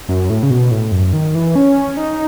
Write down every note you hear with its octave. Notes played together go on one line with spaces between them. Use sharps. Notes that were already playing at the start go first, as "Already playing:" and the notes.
F#2
A2
C#3
B2
A2
F#2
D#3
E3
C#4
D#4